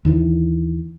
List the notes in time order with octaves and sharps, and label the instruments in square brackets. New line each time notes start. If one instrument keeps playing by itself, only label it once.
[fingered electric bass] D#2 D#3 E3